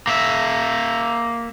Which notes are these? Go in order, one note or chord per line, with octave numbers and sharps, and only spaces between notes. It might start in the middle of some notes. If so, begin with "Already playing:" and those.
A#3 E5